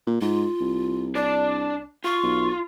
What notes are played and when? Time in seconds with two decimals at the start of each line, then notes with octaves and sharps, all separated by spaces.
0.07 A#2
0.21 G#2 F4
0.61 C2
1.16 D4 D5 A5
2.04 F4 C#6
2.23 B1